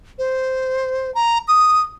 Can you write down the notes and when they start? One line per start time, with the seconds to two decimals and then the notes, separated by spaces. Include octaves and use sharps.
0.18 C5
1.15 A#5
1.48 D#6